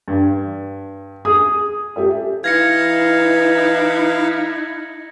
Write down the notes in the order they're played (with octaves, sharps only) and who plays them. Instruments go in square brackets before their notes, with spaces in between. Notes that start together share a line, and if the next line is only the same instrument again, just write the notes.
[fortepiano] G2
[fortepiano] G#4 [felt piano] D#6
[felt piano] G4 A4 E5
[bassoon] E3 [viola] D#4 E4 [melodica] F5 [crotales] G#6 A#6 C#7